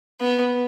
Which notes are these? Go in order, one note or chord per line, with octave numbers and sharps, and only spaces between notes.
B3